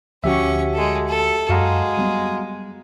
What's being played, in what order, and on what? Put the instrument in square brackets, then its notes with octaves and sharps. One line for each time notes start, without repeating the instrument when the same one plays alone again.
[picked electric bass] D2 F3 [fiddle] C#4 C#6 [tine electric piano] F#4 G4 E5
[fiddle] G#3 A4
A4
[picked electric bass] F#2 [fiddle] G#3 [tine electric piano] F#4 F5 A#5
[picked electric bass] F#3 G3 B3